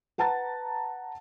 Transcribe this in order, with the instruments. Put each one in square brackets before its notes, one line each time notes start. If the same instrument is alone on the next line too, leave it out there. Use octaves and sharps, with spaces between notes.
[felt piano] B4 F#5 A5 A#5 A6